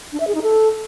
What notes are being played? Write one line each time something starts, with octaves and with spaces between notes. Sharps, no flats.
D4
E5
G#4
D#4
A4